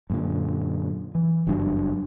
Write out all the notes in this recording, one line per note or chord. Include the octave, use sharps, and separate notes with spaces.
F#2 A#2 D3
E3
F#1 G2 F#3 D4